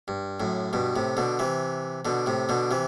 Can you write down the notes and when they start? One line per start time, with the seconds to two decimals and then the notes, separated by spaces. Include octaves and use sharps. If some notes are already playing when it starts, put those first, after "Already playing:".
0.08 G2
0.40 F#2 A2
0.73 G2 B2
0.96 A2 C3
1.17 B2 D3
1.39 C3 E3
2.05 B2 D3
2.26 A2 C3
2.49 B2 D3
2.71 C3 E3